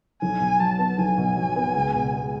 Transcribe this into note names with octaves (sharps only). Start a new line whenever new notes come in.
B1 G#5
B2
F#3 A5
B3
B1 G#5
B2
F#3
B3
C#2
B2
G#3